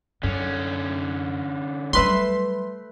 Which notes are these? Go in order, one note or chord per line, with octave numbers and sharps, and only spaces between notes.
F#2 D3 C#4
F#3 G3 A3 B4 E5 C6